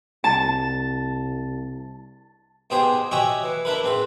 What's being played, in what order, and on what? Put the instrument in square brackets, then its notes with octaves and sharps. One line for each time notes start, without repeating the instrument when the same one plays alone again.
[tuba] C2 [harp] A5
[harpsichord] G#2 B2 G4 G#4 C5 D#6
F#4 G4 C#5 D#5 E5 G#5
E3
D4 E4 A#4 B4
G#2 C4 B4